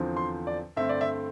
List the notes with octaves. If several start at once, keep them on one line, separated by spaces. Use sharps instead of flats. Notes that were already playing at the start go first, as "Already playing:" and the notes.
Already playing: E2 D3 F3 C4
C6
D5
G2 D3 A3 C4 E5
D5
E5